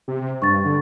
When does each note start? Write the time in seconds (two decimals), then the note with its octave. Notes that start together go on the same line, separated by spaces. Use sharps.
0.08 C3
0.42 G2 C#6 A6
0.65 D3